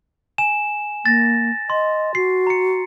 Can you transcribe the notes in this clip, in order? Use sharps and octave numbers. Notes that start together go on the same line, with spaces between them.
G#5 E7
A#3 A6 A#6
D#5 C6
F#4 C7
A#5 C#7